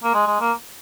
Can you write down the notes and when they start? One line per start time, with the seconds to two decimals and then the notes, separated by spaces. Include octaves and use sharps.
0.03 A#3
0.14 G#3
0.27 G#3
0.40 A#3